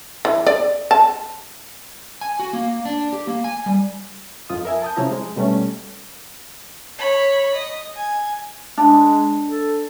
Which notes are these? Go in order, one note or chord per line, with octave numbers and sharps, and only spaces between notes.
E3
D5
A5
G#5
F#4
A#3
D4
G4
A#3
G#5
G3
F2 F4 D#6
A#4 E5 G#5
A5 D#6 G6
C3 F3 C#4 E4 A#5
G#3
B2 G3 A3 C#4
C#5 B5
D#5
G#5
G#3 D4
A4